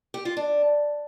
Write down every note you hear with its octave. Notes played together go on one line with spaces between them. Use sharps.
G4
F4
D4